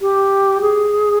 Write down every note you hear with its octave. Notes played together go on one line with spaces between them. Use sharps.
G4
G#4